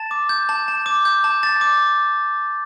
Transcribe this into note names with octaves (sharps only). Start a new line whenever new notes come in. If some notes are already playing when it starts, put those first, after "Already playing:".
Already playing: A5 A6
D6
G6
A5
A5
D6
G6
A5
A5 A6
D6